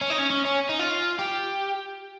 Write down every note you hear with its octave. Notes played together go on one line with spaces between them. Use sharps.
C#4
D#4
C#4
C#4
C#4
D#4
F4
G4